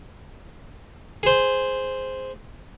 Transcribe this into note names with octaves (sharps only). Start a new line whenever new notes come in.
G#4 C5